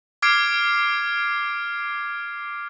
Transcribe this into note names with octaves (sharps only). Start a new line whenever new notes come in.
D6 F6 G#6 C7 D7